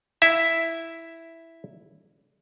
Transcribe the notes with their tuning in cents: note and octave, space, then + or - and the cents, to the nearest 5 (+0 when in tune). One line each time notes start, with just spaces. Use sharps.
E4 +0 E5 +0